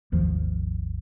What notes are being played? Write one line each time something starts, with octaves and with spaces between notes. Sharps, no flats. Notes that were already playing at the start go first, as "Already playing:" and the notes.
G#1 D#2 D#3 F3